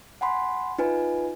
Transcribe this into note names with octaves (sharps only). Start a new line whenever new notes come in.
F#5 G#5 B5 C6
D#4 F4 B4 G#5